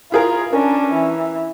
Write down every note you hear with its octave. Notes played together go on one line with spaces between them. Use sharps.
E4 F4 G#4 A#4
C#4 D4 A#4
E3